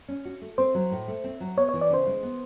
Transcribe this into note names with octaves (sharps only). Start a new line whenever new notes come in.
C#4
F#4
A3
C4 C5
F#3
A2
A3
C4
F#3
B3 C#5
C#5
E3
D5
C#3 C5
G#3
B3